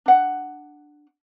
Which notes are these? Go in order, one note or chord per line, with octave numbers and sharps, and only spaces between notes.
D4 F#5